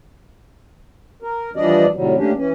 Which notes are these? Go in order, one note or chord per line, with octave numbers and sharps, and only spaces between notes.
A#4
E3 F3 G3 D4 D5 D#5
A2 C3 D#3 F#3 G3
A3 A#3 C#4 D4 G4
E3 C#4